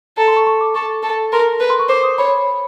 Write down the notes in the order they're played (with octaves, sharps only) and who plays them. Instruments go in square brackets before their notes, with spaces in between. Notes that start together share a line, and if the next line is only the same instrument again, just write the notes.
[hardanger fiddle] A4 [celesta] A#5
[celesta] C6
C#6
C#6
D6
[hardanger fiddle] A4 [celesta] C#6
[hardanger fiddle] A4
[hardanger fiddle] A#4 [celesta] C6
[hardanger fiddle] B4 [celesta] B5
[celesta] C6
C#6
[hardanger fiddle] C5 [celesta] D6
[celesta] D#6
[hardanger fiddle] C#5 [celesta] B5